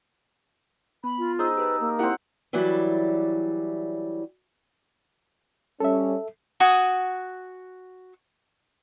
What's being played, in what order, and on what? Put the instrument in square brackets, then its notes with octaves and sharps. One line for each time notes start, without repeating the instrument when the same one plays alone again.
[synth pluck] B3 [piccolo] B5
[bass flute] F4
[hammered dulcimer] D#4 [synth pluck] G#4 C5 [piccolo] E6
[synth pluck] G4 G#4 A5 [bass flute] B4
[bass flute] A#3
[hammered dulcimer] C4 F#5 [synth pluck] E4 G4 A#4
[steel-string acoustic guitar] E3 F#3 G3 E4 D5
[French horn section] G3 C#4 [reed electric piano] A4 E5
[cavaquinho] F#4 F#5 G#5 D#6